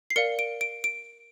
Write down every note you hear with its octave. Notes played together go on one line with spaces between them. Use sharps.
C7
A#4 D5 F5 C#7
D7
D7
D7